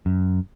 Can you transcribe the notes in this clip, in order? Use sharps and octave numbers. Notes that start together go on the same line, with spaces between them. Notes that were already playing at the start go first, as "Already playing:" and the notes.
F#2